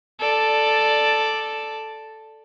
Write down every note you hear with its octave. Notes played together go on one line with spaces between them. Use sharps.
A4 D5